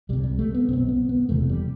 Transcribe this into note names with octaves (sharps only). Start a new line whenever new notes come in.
C2 C3 G3
G3
A3
B3
B1 B2 C4
B3
B3
E1 E2 C3 A3
G3